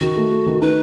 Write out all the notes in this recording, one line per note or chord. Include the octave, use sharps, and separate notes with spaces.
D#3 F#4
A3
A3
D#3
D#4 B4